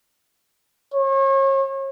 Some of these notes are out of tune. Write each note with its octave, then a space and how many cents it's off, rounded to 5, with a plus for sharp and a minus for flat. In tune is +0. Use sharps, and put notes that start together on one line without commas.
C#5 -35